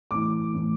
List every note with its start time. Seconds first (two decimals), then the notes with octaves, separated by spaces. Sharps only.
0.11 A2 E3 D6
0.55 A2 E3